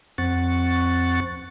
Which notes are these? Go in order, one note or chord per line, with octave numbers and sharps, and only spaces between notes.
F2 C4 F#5 C#6 A6